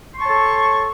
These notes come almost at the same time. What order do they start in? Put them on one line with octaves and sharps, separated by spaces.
C6 C#6 A5 C#5 A4